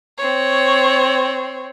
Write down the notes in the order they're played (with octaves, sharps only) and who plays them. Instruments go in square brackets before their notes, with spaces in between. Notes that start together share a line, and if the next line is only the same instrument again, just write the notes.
[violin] C4 C#5